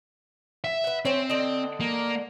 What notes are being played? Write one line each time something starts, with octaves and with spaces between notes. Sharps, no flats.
E5
B4 F#5
C4 C#4 C5
D3 D#5
A#3